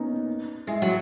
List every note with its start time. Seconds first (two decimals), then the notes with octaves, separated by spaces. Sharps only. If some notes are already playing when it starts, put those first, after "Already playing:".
Already playing: A#3 B3 C#4 D#4
0.67 G#3 E4
0.82 F#3